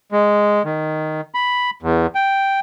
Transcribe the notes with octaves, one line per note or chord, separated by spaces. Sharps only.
G#3
D#3
B5
E2
G5